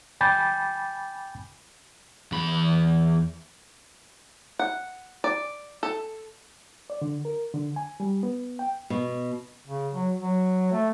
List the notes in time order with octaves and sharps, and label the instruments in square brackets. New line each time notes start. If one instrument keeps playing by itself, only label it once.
[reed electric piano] G5 G#5 B5 D6 G6 A6
[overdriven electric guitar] E2 B5
[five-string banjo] F#5
D5
A4
[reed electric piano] D5
D3
A#4
D3
G#5
G3
B3
G5
[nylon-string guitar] B2
[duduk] C#3
F#3
F#3
A3